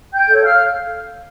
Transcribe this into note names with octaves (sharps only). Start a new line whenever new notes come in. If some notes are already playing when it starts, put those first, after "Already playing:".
G5 G6
A4 C#5
F5 F6